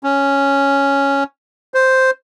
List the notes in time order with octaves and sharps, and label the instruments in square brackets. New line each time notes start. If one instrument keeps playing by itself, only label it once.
[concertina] C#4
C5